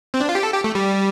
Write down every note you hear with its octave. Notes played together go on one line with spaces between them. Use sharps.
C4
D4
F4
G4
A4
G4
A3
G3